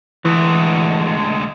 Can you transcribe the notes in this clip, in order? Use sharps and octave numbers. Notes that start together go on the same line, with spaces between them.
D2 E3 G#3